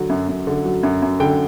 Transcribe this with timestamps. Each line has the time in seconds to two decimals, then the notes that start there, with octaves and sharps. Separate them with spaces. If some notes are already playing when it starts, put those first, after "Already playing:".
Already playing: D3 F#3
0.10 F#2
0.28 F#2
0.47 D3
0.65 F#3
0.83 F#2
1.02 F#2
1.20 D3 G5